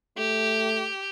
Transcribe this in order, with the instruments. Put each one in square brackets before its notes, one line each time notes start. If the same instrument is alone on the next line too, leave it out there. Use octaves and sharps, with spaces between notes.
[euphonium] A3 [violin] G4